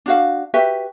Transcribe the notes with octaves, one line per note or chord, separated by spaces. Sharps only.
D4 F#4 F5
F#4 G4 B4 E5